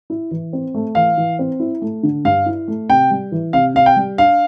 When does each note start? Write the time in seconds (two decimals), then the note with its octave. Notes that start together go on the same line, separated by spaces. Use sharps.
0.10 E4
0.31 E3
0.53 C4
0.74 A3
0.95 E3 F5
1.17 E3
1.39 C4
1.60 E4
1.82 A3
2.03 D3
2.25 G2 F5
2.46 E4
2.68 A3
2.89 C3 G5
3.11 G3
3.32 E3
3.53 C3 F5
3.75 C3 F5
3.86 G5
3.96 G3
4.18 D4 F5